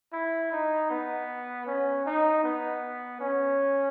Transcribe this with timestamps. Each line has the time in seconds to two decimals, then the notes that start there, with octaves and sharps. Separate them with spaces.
0.13 E4
0.52 D#4
0.90 B3
1.66 C#4
2.06 D#4
2.43 B3
3.20 C#4